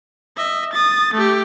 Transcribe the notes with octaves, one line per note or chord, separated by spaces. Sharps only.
D#5 E5
D#6 A6
A3 G4